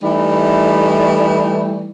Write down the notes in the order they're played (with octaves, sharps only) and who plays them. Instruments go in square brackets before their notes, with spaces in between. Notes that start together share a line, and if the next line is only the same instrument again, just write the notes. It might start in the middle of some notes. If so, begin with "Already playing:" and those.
[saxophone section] E3 G3 A3 D#4